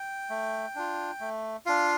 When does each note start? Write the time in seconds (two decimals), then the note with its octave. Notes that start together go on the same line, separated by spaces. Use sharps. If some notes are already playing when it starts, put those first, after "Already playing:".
Already playing: G5
0.30 A3
0.75 D4 F4
1.20 A3
1.66 D4 F4 F5